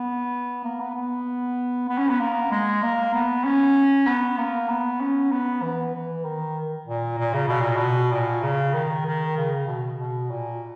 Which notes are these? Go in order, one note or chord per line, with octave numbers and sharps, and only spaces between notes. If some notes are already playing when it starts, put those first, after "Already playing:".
Already playing: B3
A#3
B3
B3
B3
C#4
B3
A#3
G#3
A#3
B3
C#4
B3
A#3
B3
C#4
B3
E3
E3
D#3
A#2
A#2
C#3
B2
A#2
B2
A#2
C#3
D#3
D#3
C#3
B2
B2
A#2